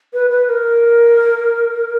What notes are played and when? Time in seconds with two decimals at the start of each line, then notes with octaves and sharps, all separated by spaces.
0.14 B4
0.31 B4
0.49 A#4